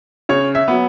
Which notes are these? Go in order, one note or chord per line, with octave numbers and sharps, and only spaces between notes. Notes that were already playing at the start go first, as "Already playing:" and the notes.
C#3 C#5
E5
F#3 B3